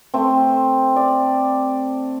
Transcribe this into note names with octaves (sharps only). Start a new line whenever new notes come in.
A3 C4
D5